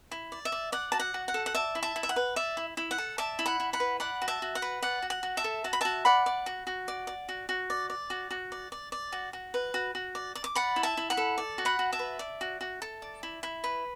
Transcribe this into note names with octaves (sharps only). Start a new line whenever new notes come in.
E4
D5
E5
D5
D5 F#5
F#4 A5
F#5
F#4
F#5
A4
F#5
D5 E5 A5
E4
E5 A5
E4
E5
F#5
B4
D5 E5
E4
E4
F#5
A4
D5 E5 A5
E4
F#5 B5
E4
F#5 B5
B4
D5 F#5 B5
F#4
E5 A5
F#4
F#5
B4
D5 F#5
F#4
F#5
F#4
E5 A5
A4
F#4 A5
B5
F#4 E5 A5
D5 F#5 B5
D5
F#4
F#4
D5
D5
F#4
F#4
D5
D5
F#4
F#4
D5
D5
D5
F#4
F#4
B4
F#4
F#4
D5
D5
D6
D5 F#5 B5
E4
E5 A5
E4
F#5 B5
A4
D5
F#4
F#5 B5
F#4
E5 A5
B4
D5
F#4
F#4
A4
D5
E4
E4
B4